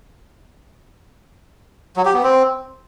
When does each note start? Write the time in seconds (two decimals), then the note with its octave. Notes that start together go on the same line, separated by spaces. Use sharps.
1.96 F#3
2.05 G4
2.14 B3
2.23 C4